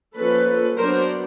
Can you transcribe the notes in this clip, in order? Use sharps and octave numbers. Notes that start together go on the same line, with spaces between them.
F3 A#3 C#4 A4 B4
F#3 B3 D4 A#4 C5